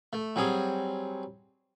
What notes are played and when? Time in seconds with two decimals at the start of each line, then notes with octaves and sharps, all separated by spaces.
0.13 A3
0.36 F#3 G3 C4 G#4